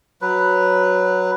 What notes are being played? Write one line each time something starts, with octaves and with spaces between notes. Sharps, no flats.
F#3 B4